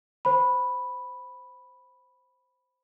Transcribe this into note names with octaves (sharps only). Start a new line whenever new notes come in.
C5 B5